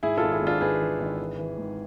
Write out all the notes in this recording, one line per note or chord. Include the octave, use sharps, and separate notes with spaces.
G#2 E4 G#4
G#1 F4 A4
E4 G#4
G#1 D4 F4
G#1 G#4 B4
E3
G#1
E3
E3
G#2